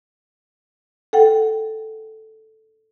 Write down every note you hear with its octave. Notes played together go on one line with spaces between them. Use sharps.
A4 F#5 G5